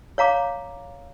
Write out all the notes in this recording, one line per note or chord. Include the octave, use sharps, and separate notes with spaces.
C#5 F5 A#5 D6